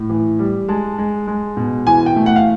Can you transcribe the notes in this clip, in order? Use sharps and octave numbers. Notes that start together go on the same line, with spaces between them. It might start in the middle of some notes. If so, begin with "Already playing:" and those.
Already playing: A2
E3
G3
G#3 A5
G#3
G#3
B2
E3 G#5
G5
A3
F#5
F5